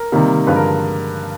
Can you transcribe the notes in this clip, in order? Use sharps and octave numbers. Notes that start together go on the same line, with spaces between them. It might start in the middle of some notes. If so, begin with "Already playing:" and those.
Already playing: A#4
C3 D#3 G3 A#3
G2 D3 F3 G#3 B4
A#4